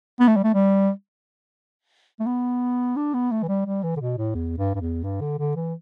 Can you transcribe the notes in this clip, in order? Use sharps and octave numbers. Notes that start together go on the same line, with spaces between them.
B3
A3
G3
A3
G3
A3
B3
D4
B3
A3
E3
G3
G3
E3
D3
B2
A2
E2
G2
G2
E2
G2
D3
D3
E3